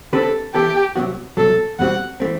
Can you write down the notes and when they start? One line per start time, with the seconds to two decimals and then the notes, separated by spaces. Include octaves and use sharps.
0.13 D3 A3 C4 G4 A4 B4
0.54 E3 B3 E4 G4 A4
0.96 C2 C3 F#3 B3 F#4
1.37 C2 B2 F#3 A4
1.79 E2 B2 G3 C4 F#4 F#5
2.20 E3 A3 C4